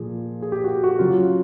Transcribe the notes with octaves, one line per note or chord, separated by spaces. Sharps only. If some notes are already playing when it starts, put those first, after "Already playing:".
Already playing: A#2 F3 G#4
G#4
G4
F#4
G4
F#4
C#3 F#3 F4